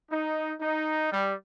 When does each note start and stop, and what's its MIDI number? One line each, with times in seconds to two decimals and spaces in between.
0.10 0.52 63
0.60 1.10 63
1.11 1.33 55